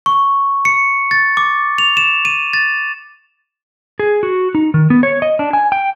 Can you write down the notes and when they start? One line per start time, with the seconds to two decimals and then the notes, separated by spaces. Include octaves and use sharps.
0.06 C#6
0.65 C#7
1.11 A6
1.37 D6
1.78 F7
1.97 E7
2.25 D#7
2.53 A6
3.99 G#4
4.23 F#4
4.55 D#4
4.74 D#3
4.90 B3
5.03 C#5
5.22 D#5
5.39 D4
5.53 G#5
5.72 G5